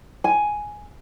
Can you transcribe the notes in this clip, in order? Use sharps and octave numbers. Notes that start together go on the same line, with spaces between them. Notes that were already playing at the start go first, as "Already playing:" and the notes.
G#5